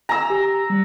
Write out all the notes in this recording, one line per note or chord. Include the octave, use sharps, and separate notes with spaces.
G#5 A#5 E6
G4
G3